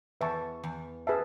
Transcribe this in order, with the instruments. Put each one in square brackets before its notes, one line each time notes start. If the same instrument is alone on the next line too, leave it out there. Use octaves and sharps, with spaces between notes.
[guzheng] E2 [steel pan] B4 E5 A5 C#6
[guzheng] E2
[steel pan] G#4 B4 E5 A5